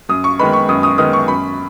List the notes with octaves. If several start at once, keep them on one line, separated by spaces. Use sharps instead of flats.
F#2 D#6
C#6
D#3 G#3 B3 B5
C#6
F#2 D#6
D#6
D#3 G#3 B3 D#6
C#6
F#2 B5